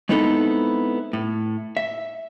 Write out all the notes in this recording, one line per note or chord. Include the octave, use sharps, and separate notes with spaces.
G#3 B3 C4 D#4 E4 A4
A2
E5